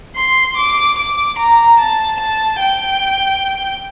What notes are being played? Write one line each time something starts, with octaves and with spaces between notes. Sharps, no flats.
C6
D6
D6
A#5
A5
A5
G5